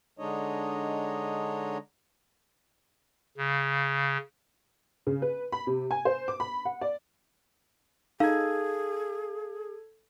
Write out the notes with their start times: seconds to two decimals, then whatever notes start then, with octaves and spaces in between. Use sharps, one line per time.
0.19 D3 G#3 D4 D#4 C#5 D#5
3.37 C#3
5.07 C#3
5.22 B4
5.52 B5
5.67 C3
5.91 G#5
6.05 C5
6.28 D6
6.40 B5
6.65 F#5
6.81 D5
8.20 D#4 G#4 A4 F5 G#6